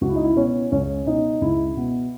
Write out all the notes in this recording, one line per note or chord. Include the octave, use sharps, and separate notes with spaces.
C#2 F#4
E4
D#4
E4
B2 C#4
C#2 C#4
B2 D#4
C#2 E4
B2